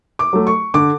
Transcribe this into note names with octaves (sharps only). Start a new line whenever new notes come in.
D6
F#3 A3
C#6
D3 D6